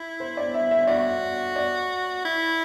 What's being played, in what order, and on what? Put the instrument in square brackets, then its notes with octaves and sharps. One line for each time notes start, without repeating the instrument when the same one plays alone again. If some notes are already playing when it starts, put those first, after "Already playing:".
Already playing: [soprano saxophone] E4
[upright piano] C5
D5
E5
E5
[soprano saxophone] F#4 [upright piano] D5
[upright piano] D5
[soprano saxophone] E4